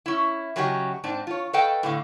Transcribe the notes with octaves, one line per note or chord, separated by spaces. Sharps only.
C#4 E4
C#3 F#3 C#4 F#4 G4 D#5
G#2 C4 D4
F4 C#5
A4 B4 D#5 F5 G5
A2 D3 F5